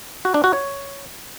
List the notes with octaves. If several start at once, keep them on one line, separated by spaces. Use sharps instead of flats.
F#4
D4
F#4
C#5